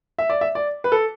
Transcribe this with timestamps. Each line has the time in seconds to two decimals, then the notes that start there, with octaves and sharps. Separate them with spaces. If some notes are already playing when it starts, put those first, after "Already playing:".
0.19 E5
0.30 D5
0.41 E5
0.55 D5
0.84 B4
0.92 A4